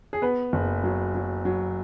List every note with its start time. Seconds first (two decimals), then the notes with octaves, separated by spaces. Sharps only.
0.13 G#4
0.22 B3 B4
0.53 F#1
0.84 F#3
1.14 F#3
1.45 F#3